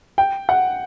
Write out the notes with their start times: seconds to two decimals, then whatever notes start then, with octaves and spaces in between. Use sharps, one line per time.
0.18 G5
0.49 F#5